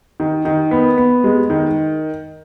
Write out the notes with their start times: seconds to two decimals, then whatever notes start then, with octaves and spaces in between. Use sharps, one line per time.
0.20 D#3
0.45 D#3
0.71 B3
0.98 B3
1.24 G#3
1.50 D#3